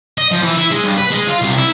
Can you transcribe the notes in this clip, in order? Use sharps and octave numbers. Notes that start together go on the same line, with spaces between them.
D#5
F3
E3
E4
G#3
G2
B4
G#3
F4
C2
E4